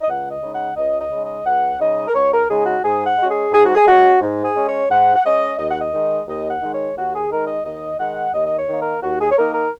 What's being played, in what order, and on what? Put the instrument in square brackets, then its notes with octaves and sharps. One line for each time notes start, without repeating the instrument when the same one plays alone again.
[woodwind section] D#5
C#2 F#5
D#5
C#3 G#3 D#4
F#5
C#2 D#5
D#5
C#3 G#3 D#4
D#5
C#2 F#5
C#3 G#3 D#4 D#5
A#4
C#2 C#5
A#4
C#3 G#3 D#4 G#4
F#4
G#2 G#4
F#5
G#3 C#4 F#4
G#4
G#2 G#4
F#4
G#4
G#3 C#4 F#4
G#2
G#4
G#3 C#4
C#5
G#2 F#5
F#5
G#3 C#4 D#5
D#2 D#5
F#5
D#5
D#3 G#3 D#4
D#2 D#5
F#5
D#3 G#3 D#4
C#5
D#2 F#4
G#4
D#3 G#3 D#4 A#4
D#5
D#2 D#5
D#3 G#3 D#4 F#5
D#2 D#5
D#5
C#5
D#3 A#3 D#4
A#4
D#2 F#4
G#4
C#5
D#3 A#3 D#4 A#4
A#4